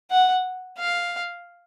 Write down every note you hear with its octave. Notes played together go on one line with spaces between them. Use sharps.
F#5
F5